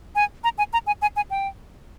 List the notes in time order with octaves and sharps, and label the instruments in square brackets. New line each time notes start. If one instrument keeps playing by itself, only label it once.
[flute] G#5
A#5
G#5
A#5
G#5
G#5
G#5
G5